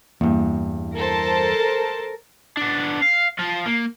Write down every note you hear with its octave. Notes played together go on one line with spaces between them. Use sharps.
E2 G2 A#3
A4 A#4 C5 A5
B3 D4
F5
F3 F4
A#3